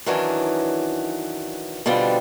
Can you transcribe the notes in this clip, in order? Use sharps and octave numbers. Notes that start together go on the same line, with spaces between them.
D#3 E3 F#3 C#4 D4
B2 D3 F3 G3 C4